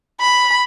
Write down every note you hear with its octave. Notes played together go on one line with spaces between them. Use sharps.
B5